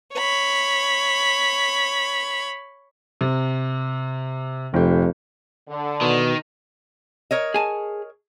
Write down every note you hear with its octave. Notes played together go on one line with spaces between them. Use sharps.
C#5 B5
C3
F1 F2 G4
D3
B2 D#3
A#4 C#5 D#5
G#4 G#5 A5